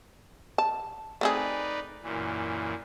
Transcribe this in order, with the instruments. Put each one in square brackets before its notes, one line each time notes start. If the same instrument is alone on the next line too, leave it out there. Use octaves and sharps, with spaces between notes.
[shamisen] A5
[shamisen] A3 C4 G#4 [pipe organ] D#4 B4 D5
[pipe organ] F#2 A#2 E3